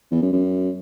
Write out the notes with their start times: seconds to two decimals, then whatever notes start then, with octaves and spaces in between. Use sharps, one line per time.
0.11 E2
0.22 F#2
0.33 F#2